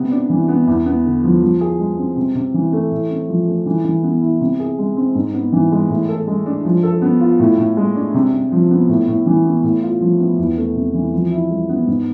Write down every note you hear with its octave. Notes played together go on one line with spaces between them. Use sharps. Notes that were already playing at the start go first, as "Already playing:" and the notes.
Already playing: C3 B3
D4
E3
B3
E2
B3
D3
F3
F3
G#4
G#3
C4
C3
C3
E3
A3
A2
C4
F3
A3
E3
E3
B3
E4
C3
G#4
G#3
C4
G#2
B3
E3
G#3
A2
A4
G#3
D4
F3
A4
B3
F4
A2
A2
G#3
D4
C3
C3
F3
B3
A2
A2
E3
B3
A2
F4
F3
B3
E2
A3
C3
E3
F3
E4
G#3
B3
G#2